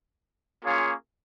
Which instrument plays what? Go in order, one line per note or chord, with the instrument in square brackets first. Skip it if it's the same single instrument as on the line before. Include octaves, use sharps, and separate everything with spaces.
[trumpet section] A#3 C#4 F4 G#4 C#5